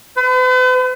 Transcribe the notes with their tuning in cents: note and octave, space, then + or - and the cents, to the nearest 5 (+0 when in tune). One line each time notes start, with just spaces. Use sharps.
B4 +45